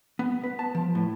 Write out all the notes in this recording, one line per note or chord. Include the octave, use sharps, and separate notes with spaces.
B3
B4
A5
F3
A2